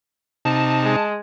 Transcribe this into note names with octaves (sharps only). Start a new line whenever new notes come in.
C3 D#4 A5
G#3